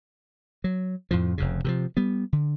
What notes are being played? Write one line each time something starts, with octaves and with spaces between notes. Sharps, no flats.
F#3
F2 A2 F3
F1 F2 C#3
C3 D#3 F3
G3 B3
D3